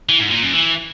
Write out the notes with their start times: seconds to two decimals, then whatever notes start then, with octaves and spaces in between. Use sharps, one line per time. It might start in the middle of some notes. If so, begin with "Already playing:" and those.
0.09 E3
0.20 G#2
0.32 A#2
0.43 F#2
0.54 E3